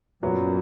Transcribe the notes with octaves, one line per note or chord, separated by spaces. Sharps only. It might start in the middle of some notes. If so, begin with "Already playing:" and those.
F#2 A#2 F#3 B3